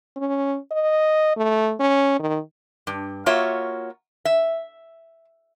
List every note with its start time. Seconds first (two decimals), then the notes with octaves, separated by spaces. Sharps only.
0.16 C#4
0.71 D#5
1.36 A3
1.80 C#4
2.19 D#3
2.87 G2
3.26 A#3 F4 F#4 C#5 E5
4.25 E5